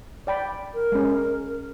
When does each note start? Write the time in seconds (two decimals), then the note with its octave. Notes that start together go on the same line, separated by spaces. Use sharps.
0.27 D5 G5 B5
0.74 A#4
0.92 G#3 C#4